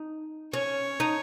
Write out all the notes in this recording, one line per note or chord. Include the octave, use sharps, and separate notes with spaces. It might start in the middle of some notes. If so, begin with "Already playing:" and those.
Already playing: D#4
C#4 C#5
D#4